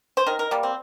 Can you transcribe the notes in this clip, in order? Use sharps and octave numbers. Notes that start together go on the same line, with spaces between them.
C5
D#3 A#4
A#4
G3 A#3
C4